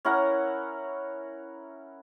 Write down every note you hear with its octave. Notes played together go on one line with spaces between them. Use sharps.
C#4 E4 A#4 F#5